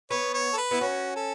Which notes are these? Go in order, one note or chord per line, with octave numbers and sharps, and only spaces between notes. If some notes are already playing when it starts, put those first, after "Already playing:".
B3 C#5
C#5
A4
B4
B3 E4
C#4 F#4
A4